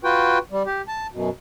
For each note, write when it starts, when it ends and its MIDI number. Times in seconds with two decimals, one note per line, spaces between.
0.04 0.38 65
0.04 0.38 66
0.04 0.38 71
0.04 0.38 79
0.51 0.63 55
0.66 0.82 67
0.88 1.07 81
1.12 1.29 42
1.12 1.29 47